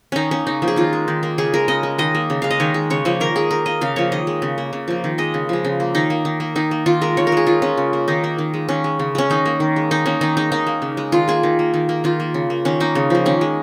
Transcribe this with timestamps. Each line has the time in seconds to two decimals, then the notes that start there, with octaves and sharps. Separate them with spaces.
0.12 D#3 C#4 D#4
0.31 A#3 C#4
0.47 C#3 D#4
0.62 F3 A#3
0.68 G#4
0.76 D#3 F4
0.93 G#3
1.08 D#3
1.23 A#3
1.38 C#3 G#4
1.54 G#3 A#4
1.68 C#3 D#5
1.83 G#3
1.98 D#3 D#5
2.15 A#3
2.30 C#3
2.42 G#3 F5
2.51 D#5
2.60 D#3 C#5
2.74 G#3
2.90 C#3 C#5
3.05 F3 A#3 C#5
3.20 D#3 A#4
3.36 G#3 G#4
3.51 D#3 A#4
3.66 A#3 D#5
3.81 C#3 F5
3.96 F3 A#3 C#5
4.12 D#3 D#5
4.27 G#3
4.42 C#3
4.58 A#3
4.73 C#3
4.88 F3 A#3
5.04 D#3
5.18 G#3 D#5
5.34 C#3
5.49 F3 G#3
5.65 C#3
5.80 A#3
5.95 D#3 D#4
6.10 A#3
6.25 D#3
6.40 A#3
6.56 D#3 D#4
6.71 A#3
6.86 D#3 F4
7.01 G#3 A#4
7.17 D#3 C#5
7.27 A#4
7.32 G#3 G#4
7.47 D#3 F4
7.62 G#3 C#4
7.77 C#3
7.93 A#3
8.08 D#3 D#4
8.24 A#3
8.38 D#3
8.54 G#3
8.69 D#3 C#4
8.84 G#3
8.99 C#3
9.15 G#3 C#4
9.30 D#3 D#4
9.46 A#3
9.60 D#3
9.76 G#3
9.91 D#3 D#4
10.06 A#3 C#4
10.21 D#3 D#4
10.37 G#3 D#4
10.52 D#3 D#4
10.67 A#3
10.82 C#3
10.97 G#3
11.12 D#3 F4
11.28 A#3 G#4
11.43 D#3
11.59 A#3
11.74 D#3
11.89 A#3
12.04 D#3 F4
12.20 A#3
12.34 C#3
12.50 A#3
12.65 D#3 C#4
12.80 A#3 D#4
12.95 C#3
13.10 F3 A#3
13.26 D#3 C#4
13.41 G#3